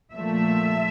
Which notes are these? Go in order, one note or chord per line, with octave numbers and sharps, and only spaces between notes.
A#2 F3 A3 E5